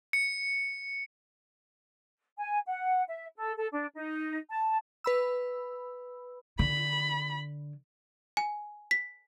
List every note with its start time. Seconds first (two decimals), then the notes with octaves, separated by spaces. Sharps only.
0.13 C#7
2.38 G#5
2.67 F#5
3.09 E5
3.36 A4
3.58 A4
3.71 D4
3.94 D#4
4.50 A5
5.04 B4 B5 E6
6.59 D3 B5
8.37 G#5
8.91 B6